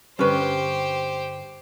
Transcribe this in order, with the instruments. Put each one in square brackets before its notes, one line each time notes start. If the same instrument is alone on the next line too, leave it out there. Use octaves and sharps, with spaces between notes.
[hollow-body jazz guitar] G2 D3 G3 [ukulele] C#4 B4 [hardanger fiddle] G4 C5